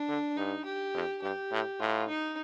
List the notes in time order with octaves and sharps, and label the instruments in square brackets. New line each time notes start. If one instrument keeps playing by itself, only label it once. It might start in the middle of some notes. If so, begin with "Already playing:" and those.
Already playing: [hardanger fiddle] D4
[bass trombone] D3
[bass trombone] G2 [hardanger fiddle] D#4
[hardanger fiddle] G4
[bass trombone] F2
[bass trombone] G2 [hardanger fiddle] G4
[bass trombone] A2
[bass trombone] A2 [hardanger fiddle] F4
[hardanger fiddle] D#4